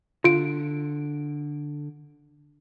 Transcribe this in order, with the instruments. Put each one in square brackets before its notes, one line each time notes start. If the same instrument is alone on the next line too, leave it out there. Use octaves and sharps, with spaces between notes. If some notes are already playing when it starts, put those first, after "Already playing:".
[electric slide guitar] D3 [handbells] F4 D7